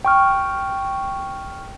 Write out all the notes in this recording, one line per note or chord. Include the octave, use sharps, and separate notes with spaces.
G5 C#6 F6